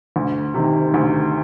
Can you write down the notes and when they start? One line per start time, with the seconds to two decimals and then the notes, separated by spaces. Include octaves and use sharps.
0.16 D2
0.54 C3 D#3
0.94 D2